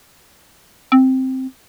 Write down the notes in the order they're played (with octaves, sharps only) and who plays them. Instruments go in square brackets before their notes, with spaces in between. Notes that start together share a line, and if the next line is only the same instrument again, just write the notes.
[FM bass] C4